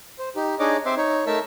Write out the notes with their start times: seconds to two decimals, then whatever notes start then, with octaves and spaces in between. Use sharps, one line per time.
0.19 C5
0.36 D#4 G4
0.59 D4 D#4 G#4 C#5 D#5 D6
0.85 C4 C5 E5 C6 D6
0.97 D#4 C#5
1.26 A3 D#4 A#4 E5 A5 E6